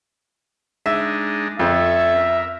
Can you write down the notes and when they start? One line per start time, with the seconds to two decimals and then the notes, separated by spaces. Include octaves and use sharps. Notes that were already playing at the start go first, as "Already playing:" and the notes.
0.86 G#3 D4 D#4 E5
1.59 F2 C#4 A4 E5
2.16 A#4